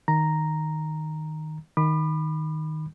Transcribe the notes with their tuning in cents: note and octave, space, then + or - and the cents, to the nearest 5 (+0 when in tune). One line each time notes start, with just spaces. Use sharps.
D#3 +0 A#5 +0
D#3 +0 B5 +0 D6 +40